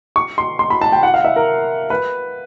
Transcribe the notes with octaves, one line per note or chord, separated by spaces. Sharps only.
C#6
C6
C6
B5
A5
G5
F#5
F5
E5
A#4
B4